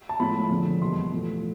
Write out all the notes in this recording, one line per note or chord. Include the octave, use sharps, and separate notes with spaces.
A5
A2 F3 G#3 B5
F2 D3 F3 G#3
E2 B2 G3 A#3 C6
A2 F3 A3